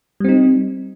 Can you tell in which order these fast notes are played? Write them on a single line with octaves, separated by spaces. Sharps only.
G3 C4 D#4